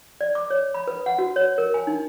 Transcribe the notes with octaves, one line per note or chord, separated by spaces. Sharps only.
D5
D6
C#5
B5
B4
F#5
F#4
C#5
A#4
G#5
D#4